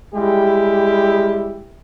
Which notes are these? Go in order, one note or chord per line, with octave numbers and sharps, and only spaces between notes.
G3 G#3 E4 G4